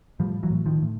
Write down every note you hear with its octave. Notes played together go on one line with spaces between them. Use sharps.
A2 F3 G3
E3 F#3
A2
D#3 F3
A2